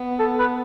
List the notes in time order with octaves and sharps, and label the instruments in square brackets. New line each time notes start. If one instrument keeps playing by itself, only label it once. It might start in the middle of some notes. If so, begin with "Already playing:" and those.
Already playing: [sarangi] B3
[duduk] A4
B4